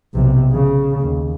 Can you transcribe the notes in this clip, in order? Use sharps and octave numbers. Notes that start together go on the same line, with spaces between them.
B1 C3
C#3
D#2